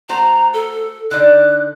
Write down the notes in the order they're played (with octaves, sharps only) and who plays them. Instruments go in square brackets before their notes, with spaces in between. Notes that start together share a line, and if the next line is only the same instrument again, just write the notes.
[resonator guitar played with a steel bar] A3 F#4 C5 [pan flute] A#5
[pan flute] A4
[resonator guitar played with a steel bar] D3 D#4 D5 [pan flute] F#6